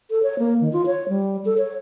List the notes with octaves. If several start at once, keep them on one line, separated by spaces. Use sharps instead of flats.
A4
C#5
A#3
D#3
F4
C#5
G3
A4
C#5